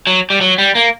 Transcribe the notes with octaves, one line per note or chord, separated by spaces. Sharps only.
F#3
G3
F#3
G3
A#3